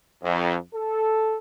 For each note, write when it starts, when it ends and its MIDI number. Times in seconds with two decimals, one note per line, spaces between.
0.22 0.56 41
0.74 1.36 69